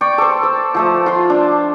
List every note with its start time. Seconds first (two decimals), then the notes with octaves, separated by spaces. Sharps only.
0.01 D5 G5 C#6
0.18 A4 C5
0.43 E6
0.74 F3 A3 E6
1.06 F4 C6
1.30 D4